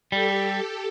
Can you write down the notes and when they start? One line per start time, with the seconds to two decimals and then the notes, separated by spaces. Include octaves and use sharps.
0.12 G3 G4 A4